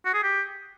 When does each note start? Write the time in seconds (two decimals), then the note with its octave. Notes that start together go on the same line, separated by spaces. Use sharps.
0.05 F#4
0.14 G#4
0.23 G4